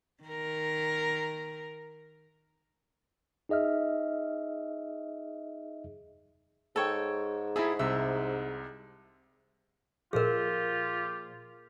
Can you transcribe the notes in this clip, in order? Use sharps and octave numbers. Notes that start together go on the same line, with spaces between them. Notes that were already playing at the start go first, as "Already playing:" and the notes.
D#3 A#4
D#4 G#4 D#5 E5 F6
G#2 A4 C#5 G5
D#4 E4 G#4 A4 E5
C2 C3 E5
A#2 F3 F4 G4 G#4 A#4